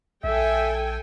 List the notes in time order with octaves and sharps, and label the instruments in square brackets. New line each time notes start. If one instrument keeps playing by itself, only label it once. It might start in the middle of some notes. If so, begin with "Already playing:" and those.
[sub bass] A#1 [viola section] A4 G5 G#5 [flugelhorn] E5